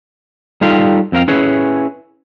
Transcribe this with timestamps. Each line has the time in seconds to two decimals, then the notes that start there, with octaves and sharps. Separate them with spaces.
0.61 G3 D#4 F4 G4 A4 F5
1.12 F2 C4 A#4 F5
1.28 C#4 E4 G#4 B4 C#5